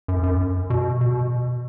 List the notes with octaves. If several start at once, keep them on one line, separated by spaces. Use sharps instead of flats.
F#2
F#2
B2
B2